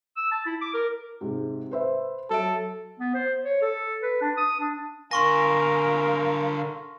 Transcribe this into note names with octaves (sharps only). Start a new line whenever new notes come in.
E6
A5
E4
D6
A#4
G#2 C3
B4 C5 E5
F#3 A4 E5 D7
B3
C5
C#5
A4
B4
D4
D#6
D4
D3 A#4 F5 G#5 C6 C#6 A#6